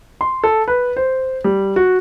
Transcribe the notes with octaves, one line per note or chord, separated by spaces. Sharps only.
C6
A4
B4
C5
G3
F#4